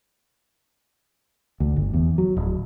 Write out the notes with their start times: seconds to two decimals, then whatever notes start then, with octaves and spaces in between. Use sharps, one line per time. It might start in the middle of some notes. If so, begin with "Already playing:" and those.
1.60 D2
1.76 G1
1.93 E2
2.18 F#3
2.37 D1